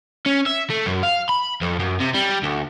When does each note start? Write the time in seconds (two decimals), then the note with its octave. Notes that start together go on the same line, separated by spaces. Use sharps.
0.26 C#4
0.46 E5
0.70 A3
0.86 F#2
1.03 F5
1.29 B5
1.61 F2
1.80 F#2
2.00 C3
2.14 G3
2.43 D2